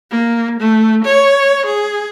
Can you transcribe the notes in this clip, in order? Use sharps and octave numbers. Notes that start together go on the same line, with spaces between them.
A#3
A3
C#5
G#4